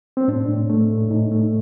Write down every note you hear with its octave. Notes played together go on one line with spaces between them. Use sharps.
C4
A2 D4
A2
A3
A2
A2 D#4
A3